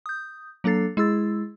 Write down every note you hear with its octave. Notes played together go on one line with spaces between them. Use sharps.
D#6 G6
F#3 A#3 D4 A4 A6 C7
G#3 E4 G#4 E6 A6